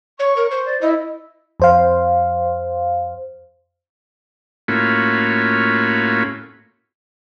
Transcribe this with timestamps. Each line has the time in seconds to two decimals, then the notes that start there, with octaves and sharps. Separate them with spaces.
0.19 C#5 C#6
0.36 A#4
0.51 C5
0.66 D5
0.82 E4 D#5
1.60 F2 C5 F5
4.68 A2 A#3 C#4 F4 F#4 B5